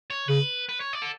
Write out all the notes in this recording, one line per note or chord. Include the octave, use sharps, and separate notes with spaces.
C#5
C#3 B4
B4
C#5
D5
A4